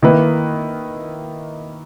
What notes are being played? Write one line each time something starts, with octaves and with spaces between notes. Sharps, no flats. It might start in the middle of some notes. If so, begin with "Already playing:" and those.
D#3 A#3 E4 B4